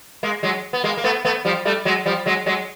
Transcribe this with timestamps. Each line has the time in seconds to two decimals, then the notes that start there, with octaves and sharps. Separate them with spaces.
0.23 G#3 A#3
0.43 F#3 G#3
0.73 B3
0.84 G#3 A#3
0.97 A#3
1.04 A3 B3
1.25 A3 B3
1.45 F3 G3
1.65 G3 A3
1.85 F#3 G#3
2.06 F3 G3
2.26 F#3 G#3
2.46 F#3 G#3